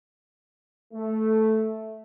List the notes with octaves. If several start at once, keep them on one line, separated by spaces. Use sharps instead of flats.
A3